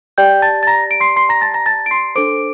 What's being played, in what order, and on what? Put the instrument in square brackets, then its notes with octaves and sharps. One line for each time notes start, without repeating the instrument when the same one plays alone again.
[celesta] G4 D5 G5 G6
A5 A6
A6
A#5 A#6
D7
C6 C7
C6 C7
A#5 A#6
A5 A6
A#5 A#6
A5 A6
D7
C6 C7
D4 A4 C5 D6 D7